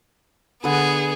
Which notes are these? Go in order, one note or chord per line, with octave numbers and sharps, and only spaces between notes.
D3 B3 G#4 B4